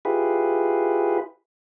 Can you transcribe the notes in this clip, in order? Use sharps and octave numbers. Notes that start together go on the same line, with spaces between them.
E4 F4 G4 G#4 B4